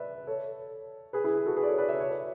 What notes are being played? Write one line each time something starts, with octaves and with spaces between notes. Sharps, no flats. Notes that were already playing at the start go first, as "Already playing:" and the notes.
Already playing: B4 D5 E5
A4 C#5
G#4 B4
E4 G#4
F#4 A4
G#4 B4
D5
A4 C#5
B4 D5
C#5 E5
C#5
B4